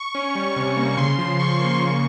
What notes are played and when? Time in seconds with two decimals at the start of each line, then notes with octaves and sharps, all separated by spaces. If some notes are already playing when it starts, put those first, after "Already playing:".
Already playing: C#6
0.15 C#4
0.35 G3
0.56 C3
0.77 A#3
0.97 C#3 C6
1.18 F3
1.39 C#3 C#6
1.60 A#3 C#6
1.81 C#3